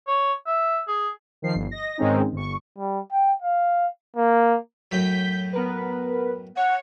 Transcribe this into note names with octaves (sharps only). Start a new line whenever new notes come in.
C#5
E5
G#4
D#3 F3 C7
G1
D#5 A#6
G#2 D#3 G#3 C4 C#4 D#4
G1 C#6
G3
G5
F5
A#3
F#2 A2 F#3 G6 B6
B3 A#4 B4
C#5 F#5